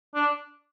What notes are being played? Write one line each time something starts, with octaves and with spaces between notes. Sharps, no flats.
D4